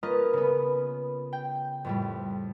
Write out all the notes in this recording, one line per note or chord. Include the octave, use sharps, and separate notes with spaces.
A#3 C#4 F4 B4 D#5
C#3 B3
G5
F2 A2 G3